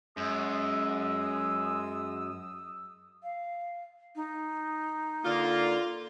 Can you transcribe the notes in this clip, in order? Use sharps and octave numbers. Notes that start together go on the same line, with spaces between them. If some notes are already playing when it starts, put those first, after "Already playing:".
F#2 G#3 D#6 E6
F5
D#4
D3 A#3 F4